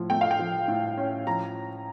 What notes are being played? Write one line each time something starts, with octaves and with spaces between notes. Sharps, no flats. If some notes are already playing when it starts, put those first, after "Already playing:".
Already playing: A2 F3
A3 G5
F5
G5
F3
A2
C#4
F3 A#5